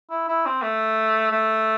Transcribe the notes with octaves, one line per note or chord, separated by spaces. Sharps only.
E4
E4
C4
A3
A3